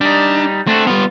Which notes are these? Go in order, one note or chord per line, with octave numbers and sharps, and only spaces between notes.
G3 D4 D#4
A3 C4 D4 F#4
G3 B3 F4